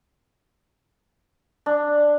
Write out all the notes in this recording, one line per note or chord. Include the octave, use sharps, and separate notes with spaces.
D4